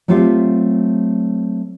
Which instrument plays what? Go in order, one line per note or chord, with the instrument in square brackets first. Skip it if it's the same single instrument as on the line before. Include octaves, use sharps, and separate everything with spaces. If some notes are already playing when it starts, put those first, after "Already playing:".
[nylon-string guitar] F#3 A3 C4 F4 G4 E5